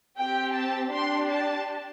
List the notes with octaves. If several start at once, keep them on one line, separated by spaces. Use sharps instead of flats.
C4 G4 G5
A5
D4 G4 C6
A5